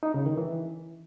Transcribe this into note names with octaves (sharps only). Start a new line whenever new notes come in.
D#4
C#3
D#3
E3